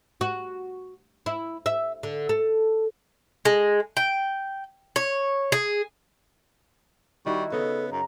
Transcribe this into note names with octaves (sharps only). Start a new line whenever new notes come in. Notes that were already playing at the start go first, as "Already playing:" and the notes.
F#4
E4
E5
D3
A4
G#3
G5
C#5
G#4
D#3 G3 E4 F#4 C#6
C#3 B3 A4 D#5
F#2 A#5